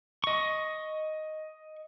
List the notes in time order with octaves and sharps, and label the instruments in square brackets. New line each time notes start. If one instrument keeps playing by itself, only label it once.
[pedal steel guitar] D#5 C#6